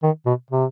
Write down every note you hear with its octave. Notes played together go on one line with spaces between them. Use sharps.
D#3
B2
C3